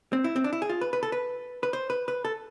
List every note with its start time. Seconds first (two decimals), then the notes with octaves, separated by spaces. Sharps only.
0.13 C4
0.24 E4
0.36 C4
0.44 D4
0.53 E4
0.62 G#4
0.69 F4
0.81 B4
0.93 B4
1.03 A4
1.12 B4
1.63 B4
1.73 C5
1.90 B4
2.08 B4
2.25 A4